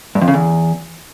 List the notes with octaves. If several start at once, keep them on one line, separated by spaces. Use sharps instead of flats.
G2
F2
C#3
E2